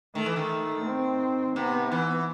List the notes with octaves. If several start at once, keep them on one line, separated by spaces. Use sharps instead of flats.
D#3 A3
E3
D#3
C4
C3 B3
E3